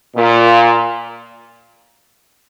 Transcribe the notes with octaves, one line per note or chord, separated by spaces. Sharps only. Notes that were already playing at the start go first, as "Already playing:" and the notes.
A#2